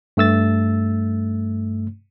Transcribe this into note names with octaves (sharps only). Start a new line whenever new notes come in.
G2 A3 E6 A6